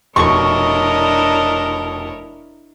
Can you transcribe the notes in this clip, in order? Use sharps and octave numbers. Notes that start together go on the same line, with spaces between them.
F1 B2 D4 E4 A#4 C#5 D#5 C#6